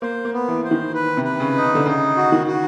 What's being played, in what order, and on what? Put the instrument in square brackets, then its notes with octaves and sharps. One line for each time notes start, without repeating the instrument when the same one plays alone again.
[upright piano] A#3 [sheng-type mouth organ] C5
[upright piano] A#3
[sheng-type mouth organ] B3
[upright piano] E3
[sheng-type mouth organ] C5
[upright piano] D#3
[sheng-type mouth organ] B4
[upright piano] C3
[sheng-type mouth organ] B4
[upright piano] C#3
[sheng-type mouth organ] D#4
[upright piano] C#3
D3
[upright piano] C#3 [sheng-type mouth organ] D#4
[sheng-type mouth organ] F#4
[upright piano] D#3
[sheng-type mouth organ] F#4